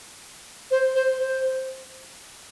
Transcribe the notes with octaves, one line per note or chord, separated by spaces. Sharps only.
C5
C5
C5